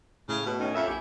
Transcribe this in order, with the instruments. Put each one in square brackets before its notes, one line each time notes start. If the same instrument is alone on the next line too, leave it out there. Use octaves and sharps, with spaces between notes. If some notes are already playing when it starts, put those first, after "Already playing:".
[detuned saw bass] A2 [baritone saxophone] C#3
[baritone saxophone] B2
[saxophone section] D#3 [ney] C#4
[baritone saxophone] F2 [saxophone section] E4 C#5 E5
[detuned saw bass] A#1 [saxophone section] E4 G4 [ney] G#5